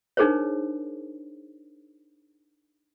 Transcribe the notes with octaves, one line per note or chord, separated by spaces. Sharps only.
D4 D#4 G#4 A#4 C5 C#5